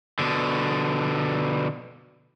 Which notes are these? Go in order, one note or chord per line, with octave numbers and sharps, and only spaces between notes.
B2 D3